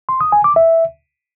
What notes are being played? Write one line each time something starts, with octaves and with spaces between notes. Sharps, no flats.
C6
D#6
G#5
D6
E5